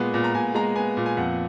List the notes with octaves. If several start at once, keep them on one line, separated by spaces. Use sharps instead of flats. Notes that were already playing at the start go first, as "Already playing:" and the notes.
Already playing: A#2 G#3 B3
A#2
A#5
A#2 G#5
G#3 A#5
B3 G#5
A#2
G#5
F2 F#5